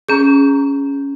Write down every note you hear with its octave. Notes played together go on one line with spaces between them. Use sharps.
C#4 G#4 A#5 G6